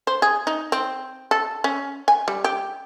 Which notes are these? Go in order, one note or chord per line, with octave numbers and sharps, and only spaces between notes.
C5
G#4
D#4
C4
A4
C#4
G#5
G3
G4